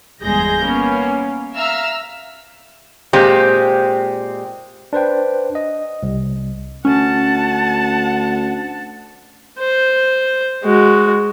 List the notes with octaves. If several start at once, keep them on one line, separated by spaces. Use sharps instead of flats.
G1 E2 G#3 G#4 G6 A#6
A#3 B3 C#4
E5 F5 A#5 E6 F6
A#2 G#3 C4 G4
D4 B4 C5 G5
D#5
C2
D2 C#4 F#5 A5
C5
G#3 F#4